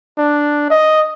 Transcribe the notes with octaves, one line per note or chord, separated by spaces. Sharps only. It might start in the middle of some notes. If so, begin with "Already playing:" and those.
D4
D#5